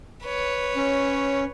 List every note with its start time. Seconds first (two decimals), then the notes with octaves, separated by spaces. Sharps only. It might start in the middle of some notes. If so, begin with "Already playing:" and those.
0.25 B4 C#5
0.76 C#4